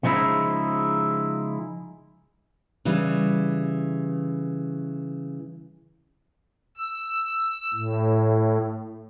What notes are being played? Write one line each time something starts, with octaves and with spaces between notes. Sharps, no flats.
C#3 F3 G#3 D#4 E4
C#3 E3 G3
E6
A2